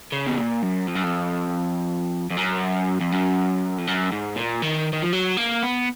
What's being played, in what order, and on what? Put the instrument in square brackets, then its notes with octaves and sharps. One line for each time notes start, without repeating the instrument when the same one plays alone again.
[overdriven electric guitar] C#3
B2
A#2
F#2
F2
F#2
F2
F2
F#2
F2
F#2
F2
F#2
G#2
A#2
D#3
D#3
F3
F#3
A#3
B3